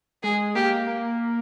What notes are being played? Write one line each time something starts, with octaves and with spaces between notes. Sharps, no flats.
G#3 G#4
A#3 G4
A#3